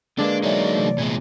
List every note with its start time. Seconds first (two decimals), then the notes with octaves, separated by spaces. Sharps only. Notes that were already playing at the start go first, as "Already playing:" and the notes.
0.18 D3 G#3 A#3 D4 B4 D6
0.43 F#3 D#4 C#5 D5 E5
0.75 C3 E3 A3
0.98 A#2 G#3 B3 G#6